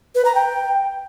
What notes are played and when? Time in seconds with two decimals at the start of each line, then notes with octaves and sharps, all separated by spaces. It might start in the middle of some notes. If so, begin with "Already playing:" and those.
0.15 B4
0.25 A#5
0.35 G5